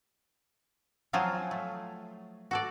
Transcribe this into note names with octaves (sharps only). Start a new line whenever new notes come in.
F3 F#3 C4 F4 G#4 C5
A3
F#4 A4 D5